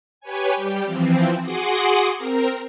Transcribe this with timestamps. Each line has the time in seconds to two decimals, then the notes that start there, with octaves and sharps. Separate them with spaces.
0.21 G4 B4 C#5 G#5
0.56 G3 G4
0.84 E3 F3 C4
1.41 F#4 G#4 F#5 C6 D6 D#6
2.16 C4 A#4